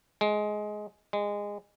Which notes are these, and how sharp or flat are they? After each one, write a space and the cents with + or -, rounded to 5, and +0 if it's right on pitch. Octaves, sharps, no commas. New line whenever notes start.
G#3 +15
G#3 -20